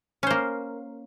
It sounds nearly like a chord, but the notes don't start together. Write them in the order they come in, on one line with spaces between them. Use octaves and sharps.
C#4 C5 A#3